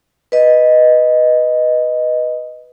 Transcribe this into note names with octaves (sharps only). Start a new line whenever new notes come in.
B4 D#5